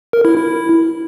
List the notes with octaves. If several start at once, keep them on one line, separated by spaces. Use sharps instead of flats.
A#4
E4
E4